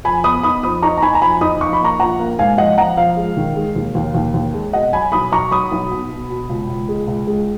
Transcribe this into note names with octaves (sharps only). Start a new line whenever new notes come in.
F2 G#5 B5
B3 B5 D#6
D#4 B5 D#6
F2 B5 D#6
D#4 A#5 C#6
A#5
D#4 G#5 B5
A#5
F2 G#5 B5
D#4 B5 D#6
F3 C#6
B5
A#3 A#5 C#6
A#1 F#5 A#5
A#3
G#2 F5 G#5
F3 D#5 F#5
F3 F#5 A#5
F3 F5
G#3
D#3
G#3
D#2
D#2
D#2
D#2
G#3
B2 D#5 F#5
F#3 G#5 B5
B1 B5 D#6
B1 A#5 C#6
F#3 B5 D#6
B1
B2
B2
B2
C#2
C#2
G#3
C#2
G#3